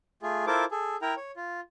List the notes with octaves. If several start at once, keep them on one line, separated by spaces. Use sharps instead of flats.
A3 F4 G#4
E4 F4 A4 A#4 C5 D6
G#4 A4
E4 A#4 G5 A#5
C#5
F4